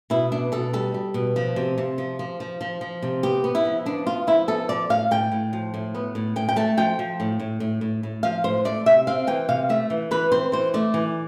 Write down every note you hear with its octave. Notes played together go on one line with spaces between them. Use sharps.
B2 E4
B3 D4
B2 A4
G3 A4
G3
B2
F3
C3
C3
F3
F3
F3
F3
F3
C3
B3 G4
B3
E4
F3
B3 D4
B3 F4
F3 E4
B3 A4
F3 D5
A2 F5
A2 G5
A2
F3
A2
B3
A2
A2 G5
G5
A3 A5
F3 G5
F3
A2
A2
A2
A2
A2
F3 F5
A2 C5
A3 D5
C3 E5
C4 F5
E3 G5
C3 F5
A3 E5
E3
E3 B4
C4 C5
E3 C5
A3 D5
E3